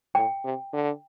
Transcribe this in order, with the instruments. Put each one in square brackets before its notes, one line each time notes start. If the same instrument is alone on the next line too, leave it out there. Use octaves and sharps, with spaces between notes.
[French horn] A2 [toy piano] G5
[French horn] C3
D3